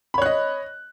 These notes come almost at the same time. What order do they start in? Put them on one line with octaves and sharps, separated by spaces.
B5 C#5 F#6 D#5